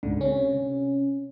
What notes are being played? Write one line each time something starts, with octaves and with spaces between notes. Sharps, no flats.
C#2 G#2 D3
C3 C#4